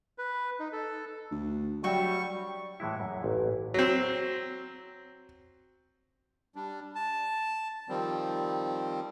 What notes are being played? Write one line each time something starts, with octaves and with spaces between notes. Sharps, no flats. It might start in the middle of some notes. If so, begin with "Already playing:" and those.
B4
D#4
A4
D2
F#3 G3 F#4 E5 G5 C#6
A2 E3 G#3 E4
F#2
A1 A#2
F#3 C4
G3 D4
A5
D#3 F3 G3 C4